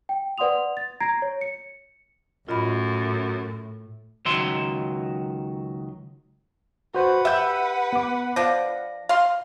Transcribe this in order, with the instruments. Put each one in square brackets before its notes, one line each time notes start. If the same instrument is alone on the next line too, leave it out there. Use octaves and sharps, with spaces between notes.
[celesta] G5
B4 D5 F#5 C6 D#6 F7
A6
A#5 G#6 A#6 C7 D7
C#5
C#7
[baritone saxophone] F#2 [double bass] A2 [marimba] F4 D#5 B5
[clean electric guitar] C#2 D#3 F#3 E5 C6
[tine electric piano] F#4 C5 [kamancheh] B4 F#5
[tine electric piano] G4 E6 G6 [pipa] E5
[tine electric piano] B3 D6
[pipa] F3 D4 [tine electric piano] A#6
[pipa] F5 C6